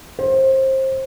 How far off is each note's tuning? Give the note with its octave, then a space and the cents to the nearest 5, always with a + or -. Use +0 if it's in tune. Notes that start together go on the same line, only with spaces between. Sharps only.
C5 +25